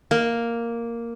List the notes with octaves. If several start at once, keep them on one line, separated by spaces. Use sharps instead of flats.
A#3